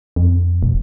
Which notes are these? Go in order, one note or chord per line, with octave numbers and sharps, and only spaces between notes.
F2
E1